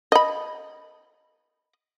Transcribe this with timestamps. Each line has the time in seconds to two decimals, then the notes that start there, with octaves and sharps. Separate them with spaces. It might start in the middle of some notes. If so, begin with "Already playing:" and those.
0.12 D#5 B5